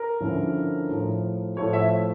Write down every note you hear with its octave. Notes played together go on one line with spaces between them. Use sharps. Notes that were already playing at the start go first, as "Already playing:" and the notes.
Already playing: A#4
G2 D3 F3 C#4 E4
A2 F3 A3
A2 F3 A3 C#5
E5